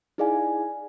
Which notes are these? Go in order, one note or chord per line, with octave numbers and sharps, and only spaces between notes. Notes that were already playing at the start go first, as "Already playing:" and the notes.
D#4 E4 G#4 D5 F5 G#5